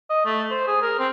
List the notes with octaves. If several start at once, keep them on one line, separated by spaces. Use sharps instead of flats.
D#5
A3
C5
G#4
A#4
C4